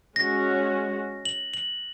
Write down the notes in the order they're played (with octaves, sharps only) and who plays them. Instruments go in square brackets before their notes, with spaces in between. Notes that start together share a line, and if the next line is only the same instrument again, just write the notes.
[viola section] G#3 C#4 F#4 [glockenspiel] A#6
[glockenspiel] F#7
F#7